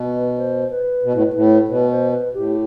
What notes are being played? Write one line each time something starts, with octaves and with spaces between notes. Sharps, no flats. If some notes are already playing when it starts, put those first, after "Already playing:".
Already playing: B2 B4
C5
B4
B2
A2
A2
B2 B4
C5
B4
A2 G4